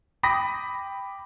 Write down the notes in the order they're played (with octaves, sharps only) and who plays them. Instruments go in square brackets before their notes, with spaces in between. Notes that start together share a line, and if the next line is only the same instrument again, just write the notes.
[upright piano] G5 B5 D6 D#6 A#6 B6